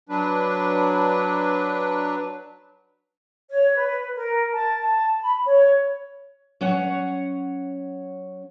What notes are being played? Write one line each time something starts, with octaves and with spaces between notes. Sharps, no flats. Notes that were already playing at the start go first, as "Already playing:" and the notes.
F#3 D4 B4
C#5
B4
A#4
A5
A5
B5
C#5
F#3 C#4 C#5 F#5